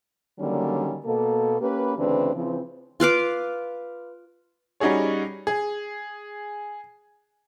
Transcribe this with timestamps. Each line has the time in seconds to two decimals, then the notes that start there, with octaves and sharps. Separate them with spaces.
0.40 D3 D#3 F#3 G3 A#3 C#4
1.05 B2 A#3 A4
1.61 A#3 C#4 G4 B4
1.97 D2 C#3 E3 C4 D4 B4
2.34 C#3 E3 F3 C4
3.00 F4 B4 F5 D6
4.80 G3 C#4 D#4 F#4 G#4 C#5
5.47 G#4